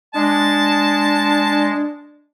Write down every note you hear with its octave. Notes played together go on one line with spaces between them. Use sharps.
G#3 D4 A5